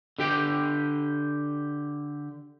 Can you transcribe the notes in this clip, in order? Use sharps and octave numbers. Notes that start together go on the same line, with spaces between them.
D3 G4 G5